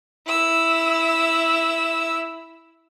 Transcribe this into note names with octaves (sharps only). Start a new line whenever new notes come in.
E4 E6